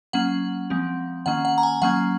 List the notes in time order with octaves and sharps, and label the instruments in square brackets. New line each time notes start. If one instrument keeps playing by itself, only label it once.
[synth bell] F#3 A#3 C#4 F#5
F3 G#3 C4
D#3 A#3 C#4 F#5
F#5
A#5
G#5
F#3 A#3 C#4 F#5